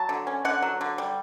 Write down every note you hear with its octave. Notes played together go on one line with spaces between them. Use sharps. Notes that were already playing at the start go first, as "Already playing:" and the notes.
Already playing: F#3 A5
D3
C#4
D3 F#5
F#3
D3
G3